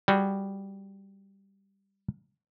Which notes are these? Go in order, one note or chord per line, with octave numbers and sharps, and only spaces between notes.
G3 F#4 G#4